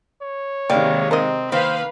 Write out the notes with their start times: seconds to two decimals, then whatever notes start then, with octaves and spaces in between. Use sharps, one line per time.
0.22 C#5
0.70 C3 D#3 G3 G#3 A#3
1.11 C4 A#4 D#5
1.52 D#3 A#3 B4 C5 F5